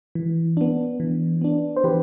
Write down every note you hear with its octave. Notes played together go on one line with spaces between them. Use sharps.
E3
B3 D4
E3
B3 D4
C5
E3 G4 B4